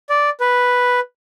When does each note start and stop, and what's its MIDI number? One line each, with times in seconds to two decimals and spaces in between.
0.10 0.30 74
0.40 1.00 71